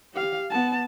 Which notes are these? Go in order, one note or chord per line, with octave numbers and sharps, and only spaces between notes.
G4 F5
B3 A5